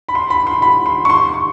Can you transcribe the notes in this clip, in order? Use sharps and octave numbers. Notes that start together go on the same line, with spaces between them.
B5
C6
B5
C6
B5
C6
C#6
C6
C#6